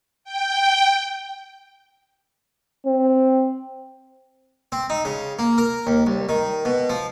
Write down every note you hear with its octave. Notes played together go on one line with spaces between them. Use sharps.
G5
C4
C4
D#4
C#3
A#3
A#4
D#2
C2
D#3
B2
F3